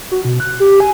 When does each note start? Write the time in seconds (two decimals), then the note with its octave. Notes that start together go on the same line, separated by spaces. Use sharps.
0.11 F#4
0.25 B2
0.40 F#6
0.60 G4
0.80 G#5